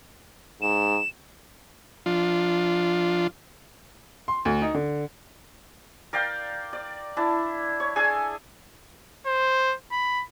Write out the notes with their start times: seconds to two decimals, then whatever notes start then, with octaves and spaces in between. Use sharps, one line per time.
0.62 G#2 E7
2.06 F3 D4 F4
4.28 C6
4.45 D2
4.62 D#4
4.74 D3
6.13 A#4 D5 F5 G5
6.73 D5
7.17 D4 E4 A5
7.80 C#5
7.96 D4 G#4 A4 G#5
9.26 C5
9.91 B5